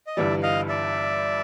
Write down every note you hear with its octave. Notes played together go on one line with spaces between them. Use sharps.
D#5
G1 G2 E3 G3 D5 E5
D#5 F5
D5 E5